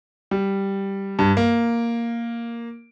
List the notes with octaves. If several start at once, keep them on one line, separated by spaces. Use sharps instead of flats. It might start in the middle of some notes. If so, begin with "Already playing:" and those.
G3
G2
A#3